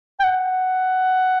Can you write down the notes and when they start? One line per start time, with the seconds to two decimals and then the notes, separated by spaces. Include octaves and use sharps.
0.20 G5
0.24 F#5